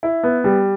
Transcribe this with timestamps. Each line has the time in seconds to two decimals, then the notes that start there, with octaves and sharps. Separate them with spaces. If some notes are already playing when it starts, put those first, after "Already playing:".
0.03 E4
0.23 B3
0.44 G3